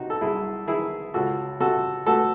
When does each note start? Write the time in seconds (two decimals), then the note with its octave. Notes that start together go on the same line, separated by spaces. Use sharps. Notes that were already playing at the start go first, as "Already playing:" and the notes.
Already playing: C3 D#4 F#4
0.10 A4
0.21 C2 E4 G#4
0.67 D#3 E4 G#4
1.14 C#2 F#4 A4
1.60 C3 F#4 A4
2.06 A3 F#4 A4